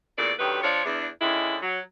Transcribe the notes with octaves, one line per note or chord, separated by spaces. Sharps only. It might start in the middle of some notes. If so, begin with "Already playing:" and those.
E2 A#2 A3 A4 D5
D2 D#3 F#3 G4 B4
F3 D4 F4 C#5
E2 D4
D3 D#3 G#3 C#4 E4
F#3